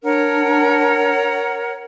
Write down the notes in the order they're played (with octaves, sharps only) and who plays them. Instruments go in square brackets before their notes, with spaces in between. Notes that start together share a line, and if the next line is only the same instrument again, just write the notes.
[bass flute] D4 [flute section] A#4 C#5 F#5